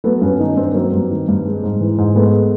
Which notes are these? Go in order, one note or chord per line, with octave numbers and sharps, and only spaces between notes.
F#3 A3 B3
G2 B3 C#4
D#3 C#4 D#4
G2 C4 D4
F#3 A#3 C4
G2
D#3
G2
G#3
G#2
E3
G#2
G#3 A3 B3